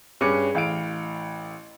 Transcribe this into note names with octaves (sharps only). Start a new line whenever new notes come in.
G2 C#4 G#4 D6 C#7
A1 F5 D7